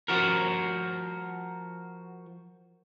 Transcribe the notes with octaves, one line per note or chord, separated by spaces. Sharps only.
F3 F#4 A#4